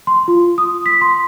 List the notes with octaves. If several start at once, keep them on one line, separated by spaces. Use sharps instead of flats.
C6
F4
D#6
B6
C6